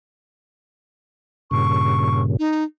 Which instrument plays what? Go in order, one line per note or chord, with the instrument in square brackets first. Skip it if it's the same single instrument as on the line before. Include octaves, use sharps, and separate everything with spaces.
[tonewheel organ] G2 A#2 C#3 [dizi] C#6
[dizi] D#4